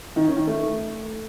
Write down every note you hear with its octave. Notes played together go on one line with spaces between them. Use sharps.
D#3
C#4
D#3
A3